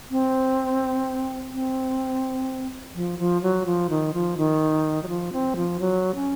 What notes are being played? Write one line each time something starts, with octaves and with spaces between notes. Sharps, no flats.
C4
C4
F3
F3
F#3
F3
D#3
F3
D#3
F#3
F3
C4
F3
F#3
C#4